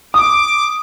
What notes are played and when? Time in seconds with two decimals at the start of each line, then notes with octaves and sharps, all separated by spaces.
0.14 D6 D#6